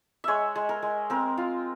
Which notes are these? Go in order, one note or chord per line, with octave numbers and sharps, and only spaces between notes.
G#3 C#5 E5
G#3
A#4
G#3
C4 A#4
F4